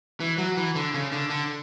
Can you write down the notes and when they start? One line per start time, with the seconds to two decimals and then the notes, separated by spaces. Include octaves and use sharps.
0.20 E3
0.38 F#3
0.57 E3
0.75 D3
0.94 C#3
1.12 D3
1.30 D3